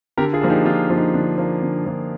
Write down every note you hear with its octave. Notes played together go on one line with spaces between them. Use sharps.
D3 G4 A#4
F4 G#4
F3 A#3 D4
D#4 G4
D3 D4 F4
F3 A#3 D4 F4
D#4
D3 D4
F3 A#3 D4
D3
F3 A#3 D4